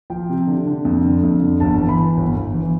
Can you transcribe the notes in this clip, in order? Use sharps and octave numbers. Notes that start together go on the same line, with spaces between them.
F3 G5
C3
D3
D3
F2
D3
F2
D3
G1 A5
E3
B5
E3
G1
G1
E3